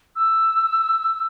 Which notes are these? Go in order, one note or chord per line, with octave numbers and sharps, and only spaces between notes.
E6